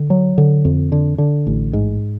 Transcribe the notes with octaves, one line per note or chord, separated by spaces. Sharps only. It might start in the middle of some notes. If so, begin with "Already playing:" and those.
Already playing: D3
F#3
D3
F2
D3
D3
A1
G#2